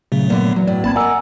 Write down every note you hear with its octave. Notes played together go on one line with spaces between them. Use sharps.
A#2 C#3 F#3 A3
D3 A#3 B3
E2 F#3
A2 D5
A1 A#3 C4 A5 B5 G#6
A#4 D5 D#5 F#5 G#5 A#5 E6